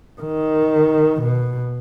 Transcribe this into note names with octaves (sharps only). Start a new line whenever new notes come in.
D#3
B2